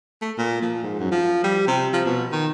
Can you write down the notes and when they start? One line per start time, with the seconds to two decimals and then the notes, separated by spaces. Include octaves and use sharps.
0.22 A3
0.37 A#2
0.62 F3
0.83 G#2
0.99 F#2
1.11 F3
1.44 G3
1.68 C3
1.93 F3
2.06 B2
2.32 D#3